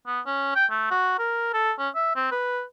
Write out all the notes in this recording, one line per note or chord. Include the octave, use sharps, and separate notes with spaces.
B3
C#4
G5
A3
F#4
A#4
A4
C#4
E5
C4
B4